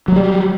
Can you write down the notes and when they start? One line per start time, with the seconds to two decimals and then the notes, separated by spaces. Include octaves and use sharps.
0.08 F#3
0.12 A3
0.16 G3